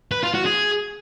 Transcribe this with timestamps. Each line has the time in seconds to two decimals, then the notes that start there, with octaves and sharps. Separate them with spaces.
0.12 B4
0.23 F4
0.34 F#4
0.45 G#4